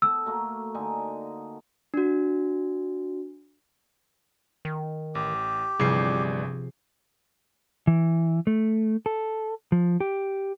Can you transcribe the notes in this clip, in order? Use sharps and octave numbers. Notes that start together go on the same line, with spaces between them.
B3 A4 E6
A3 A#3 F#4
D3 D#4 G#5
D4 F#4
D#3
A1 G4
G1 C3 E3 F3 G3 G#4 C7
E3
A3
A4
F3
G4